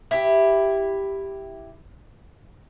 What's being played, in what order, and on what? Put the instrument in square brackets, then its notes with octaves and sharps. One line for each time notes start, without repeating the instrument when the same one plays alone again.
[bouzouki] E4 G4